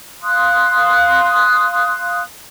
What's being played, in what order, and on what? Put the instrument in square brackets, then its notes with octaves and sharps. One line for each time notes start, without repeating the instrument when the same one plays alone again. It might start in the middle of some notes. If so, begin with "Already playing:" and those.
[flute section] F5 C6 D#6 F#6